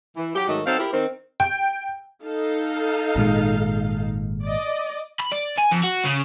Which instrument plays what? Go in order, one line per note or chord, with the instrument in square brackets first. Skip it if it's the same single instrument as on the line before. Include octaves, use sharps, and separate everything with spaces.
[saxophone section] E3
F#3 G4
G#2 D#3 F#3 A3 F#4 D#5
F#3 C4 D#4 A4 F5
E4 G4 A#4
D#3 C4
[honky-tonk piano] G5
[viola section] D#4 A4 F5
[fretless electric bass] G#1 A#2 G#3
[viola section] D5 D#5
[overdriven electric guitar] B5
D5
G#5
F2
F#4
C#3